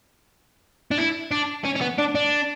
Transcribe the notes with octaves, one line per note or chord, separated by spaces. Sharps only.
D4
E4
D4
C#4
C#4
B3
D4
D4